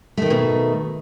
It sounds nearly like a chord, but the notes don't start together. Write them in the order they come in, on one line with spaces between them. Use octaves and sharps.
A3 D#3 D#4 B2